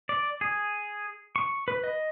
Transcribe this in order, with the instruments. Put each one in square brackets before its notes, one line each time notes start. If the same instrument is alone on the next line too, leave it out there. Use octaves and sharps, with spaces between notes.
[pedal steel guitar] D5
G#4
C#6
B4
D#5